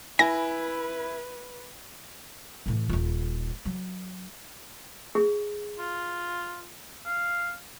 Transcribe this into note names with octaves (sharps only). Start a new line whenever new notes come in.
E4 B4 G#5 A#6
A2 E3
D#1 F4
F#3
G#4
F4
F5